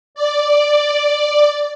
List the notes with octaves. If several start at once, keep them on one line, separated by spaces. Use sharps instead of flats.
D5